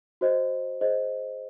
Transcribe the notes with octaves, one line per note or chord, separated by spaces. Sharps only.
F#4 C5 D#5
G#4 C5 D#5